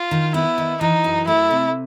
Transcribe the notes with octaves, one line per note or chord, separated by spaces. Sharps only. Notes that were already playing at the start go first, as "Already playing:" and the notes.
Already playing: F4
D#3
B3 E4
D#3
E3 D#4
F#2
A3 E4
C3